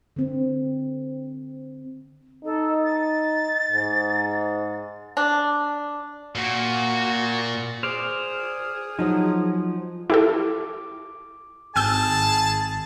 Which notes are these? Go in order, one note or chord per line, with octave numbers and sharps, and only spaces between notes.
D3 C4
D#4 A4
A6
G#2
D4
A#2 F#4
G#4 C5 D5 F6
F3 F#3 D#4
E4 G4 A4 D6
G#1 G#4 G5 A5 E6 G6